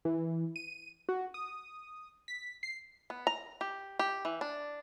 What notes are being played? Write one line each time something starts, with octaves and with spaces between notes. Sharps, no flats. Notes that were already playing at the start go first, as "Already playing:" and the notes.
E3
D#7
F#4
D#6
B6
C7
B3
A#5
G4
G4
E3
D4